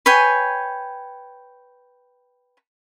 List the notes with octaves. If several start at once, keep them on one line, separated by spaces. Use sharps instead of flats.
B4 C#5 G5 G#5